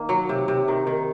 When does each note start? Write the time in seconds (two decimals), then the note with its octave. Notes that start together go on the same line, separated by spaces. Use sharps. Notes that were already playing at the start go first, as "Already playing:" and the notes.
Already playing: D#3 A#3
0.09 F#3
0.29 C3
0.48 C3
0.68 D#3
0.87 D#3